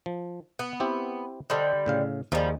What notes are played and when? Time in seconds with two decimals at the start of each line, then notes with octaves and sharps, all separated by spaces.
0.06 F3
0.59 B3 F#5
0.80 C4 E4 G4
1.50 D3 G3 A4 C5 D#5
1.86 A2 C#3 F5
2.32 D#2 F3 G3 D#4 G#4